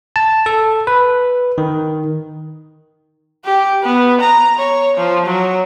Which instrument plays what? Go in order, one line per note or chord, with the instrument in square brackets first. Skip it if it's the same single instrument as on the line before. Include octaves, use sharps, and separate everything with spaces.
[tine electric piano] A5
A4
B4
D#3
[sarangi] G4
B3
A#5
C#5
F3
F#3